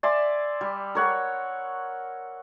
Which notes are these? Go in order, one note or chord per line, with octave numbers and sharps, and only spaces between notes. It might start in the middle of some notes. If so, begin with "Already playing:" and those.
D5 E5 G#5 C6
G3
A#4 C#5 F#5